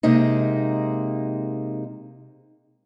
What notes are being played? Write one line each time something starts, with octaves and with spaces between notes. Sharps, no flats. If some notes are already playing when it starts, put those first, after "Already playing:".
C3 G#3 A#3 D#4